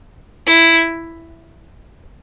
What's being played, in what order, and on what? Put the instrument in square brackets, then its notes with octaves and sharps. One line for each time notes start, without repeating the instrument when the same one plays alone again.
[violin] E4